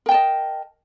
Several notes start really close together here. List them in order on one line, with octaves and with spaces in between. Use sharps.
A#4 G5 A5 D#5